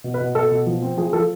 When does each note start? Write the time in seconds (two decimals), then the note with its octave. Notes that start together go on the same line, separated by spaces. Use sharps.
0.04 B2
0.14 B4
0.20 B2
0.35 B2 A4
0.51 B2
0.66 F3
0.82 C4
0.97 F3 G#4
1.13 F3 A4